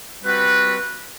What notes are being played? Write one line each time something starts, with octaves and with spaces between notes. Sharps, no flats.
G3 C4 F#4 B4 F#5